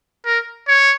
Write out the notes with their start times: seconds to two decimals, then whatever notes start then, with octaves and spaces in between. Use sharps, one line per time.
0.26 A#4
0.68 C#5